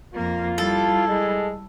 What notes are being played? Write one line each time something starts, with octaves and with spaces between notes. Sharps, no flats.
F2 A#3 F4
G3 E4 A4
G#3